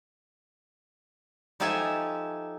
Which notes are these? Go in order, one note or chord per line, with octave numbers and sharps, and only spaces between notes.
F3 D#4 G4 A4 E5 G#5